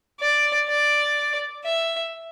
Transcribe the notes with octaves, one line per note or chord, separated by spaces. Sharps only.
D5
D5
E5